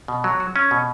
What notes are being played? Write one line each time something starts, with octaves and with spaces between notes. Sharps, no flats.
B2
F#3
F#4
C#4
B2